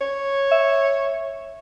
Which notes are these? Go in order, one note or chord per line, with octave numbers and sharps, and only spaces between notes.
C#5
E5